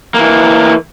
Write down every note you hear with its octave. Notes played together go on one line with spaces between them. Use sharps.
E3 A#3